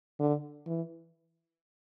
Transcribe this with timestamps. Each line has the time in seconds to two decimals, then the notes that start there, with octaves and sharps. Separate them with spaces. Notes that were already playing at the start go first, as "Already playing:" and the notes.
0.19 D3
0.67 E3